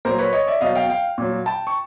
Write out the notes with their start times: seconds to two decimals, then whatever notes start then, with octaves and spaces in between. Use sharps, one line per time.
0.05 A#2 F#3 A#4 C5
0.18 B4 C#5
0.33 C#5 D#5
0.47 D5 E5
0.61 B2 F#3 D#5 F5
0.75 F5 G5
0.90 F5 G5
1.18 A#2 F#3
1.46 G5 A5
1.67 C#6